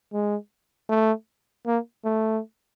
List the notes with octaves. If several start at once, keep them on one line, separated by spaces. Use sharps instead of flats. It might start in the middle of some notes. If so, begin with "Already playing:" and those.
G#3
A3
A#3
A3